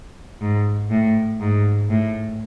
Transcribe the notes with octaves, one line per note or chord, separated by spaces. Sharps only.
G#2
A2
G#2
A2